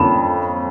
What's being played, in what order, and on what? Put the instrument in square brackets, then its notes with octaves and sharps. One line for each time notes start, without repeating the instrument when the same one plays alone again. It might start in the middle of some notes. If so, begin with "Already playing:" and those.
Already playing: [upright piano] F2 D3 F3 A#3 C#4 [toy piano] A5 B5